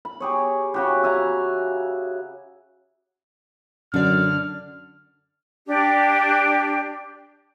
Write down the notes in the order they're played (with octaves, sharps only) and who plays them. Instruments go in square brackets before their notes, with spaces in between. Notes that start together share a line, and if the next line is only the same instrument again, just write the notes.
[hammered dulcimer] B5
G4 G#4 C#5
C#3 F#4 G4
E5 G#5 A#5
[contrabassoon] F#2 [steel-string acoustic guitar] D3 D5 [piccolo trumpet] F6
[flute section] D4 G4